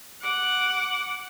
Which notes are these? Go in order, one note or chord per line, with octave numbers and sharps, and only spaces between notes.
F#5 D6